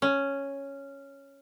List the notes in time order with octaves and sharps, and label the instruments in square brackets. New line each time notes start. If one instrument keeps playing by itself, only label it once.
[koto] C#4